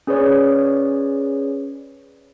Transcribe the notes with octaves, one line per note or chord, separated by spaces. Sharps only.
C#4 G#4 B4 C#5 D5